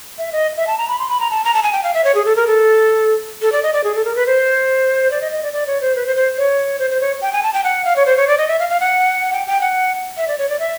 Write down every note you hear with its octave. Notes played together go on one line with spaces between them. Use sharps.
E5
D#5
E5
A5
A#5
B5
C6
B5
A#5
A5
A#5
A5
G#5
G5
F5
E5
C#5
G#4
A4
A#4
A4
A4
D5
D#5
D5
G#4
A4
A#4
B4
C5
D5
D#5
D#5
D5
D5
C#5
C5
B4
C5
C5
C#5
C5
C5
C#5
G5
G#5
A5
G5
F#5
F5
C#5
C5
C#5
D5
D#5
E5
F5
F5
F#5
G5
G5
F#5
E5
D5
C#5
D5
E5